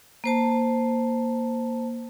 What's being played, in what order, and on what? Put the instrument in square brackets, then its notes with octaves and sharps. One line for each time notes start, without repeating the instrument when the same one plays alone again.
[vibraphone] A#3 C5 A5